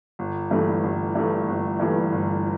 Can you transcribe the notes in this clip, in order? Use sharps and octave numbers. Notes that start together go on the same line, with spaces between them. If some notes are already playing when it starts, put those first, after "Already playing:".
G1
G2 E3 A3
G1
G2 E3 A3
G1
G2 E3 A3
G1